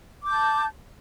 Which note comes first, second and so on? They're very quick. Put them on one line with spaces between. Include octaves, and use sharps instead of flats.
D6 G6 A5